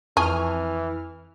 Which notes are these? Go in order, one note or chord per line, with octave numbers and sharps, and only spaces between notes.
F2 E3 G#4 A5 C#6 F6